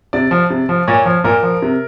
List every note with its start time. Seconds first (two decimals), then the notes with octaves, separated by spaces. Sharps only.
0.13 C3 D5
0.31 F3
0.50 C3
0.69 F3
0.88 A#2 C#5
1.06 F3
1.24 A#2 A#4
1.43 F3
1.62 C3